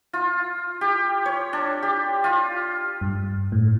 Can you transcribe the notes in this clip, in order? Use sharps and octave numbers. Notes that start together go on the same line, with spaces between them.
F4
G4
C#5
D4
G4
F4
G2
A2